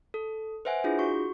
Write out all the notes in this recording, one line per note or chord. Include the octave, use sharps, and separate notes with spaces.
A4
B4 C5 E5 F#5 G#5
D4 E4 F4 G#4
F#4 C#6